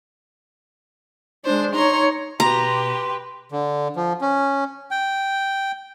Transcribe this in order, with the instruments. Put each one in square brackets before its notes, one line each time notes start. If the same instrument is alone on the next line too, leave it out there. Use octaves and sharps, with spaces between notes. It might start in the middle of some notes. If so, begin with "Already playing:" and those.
[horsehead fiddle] G#3 D4 [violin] C5
[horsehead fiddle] D#4 C#5 [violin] A#5 C6
[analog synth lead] B2 [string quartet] G4 B4 [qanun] A#5 [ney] C6
[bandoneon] D3
F3
C#4
G5